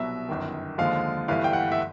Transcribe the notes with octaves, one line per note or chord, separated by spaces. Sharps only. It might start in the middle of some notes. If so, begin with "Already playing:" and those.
Already playing: C2 B2 F#3 E5
G1 F#2 D#3
D#2 D3 F3 G#3 F5
G1 G2 E3 A3 F5
G5
F#5
E5